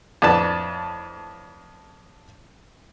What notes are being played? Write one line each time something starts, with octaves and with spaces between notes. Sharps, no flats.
F2 A2 D4 B4 A5